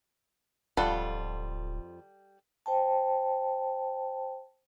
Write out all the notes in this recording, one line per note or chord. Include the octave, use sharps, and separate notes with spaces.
D1 F2 G3 F4 A4 F#5
C5 G5 A5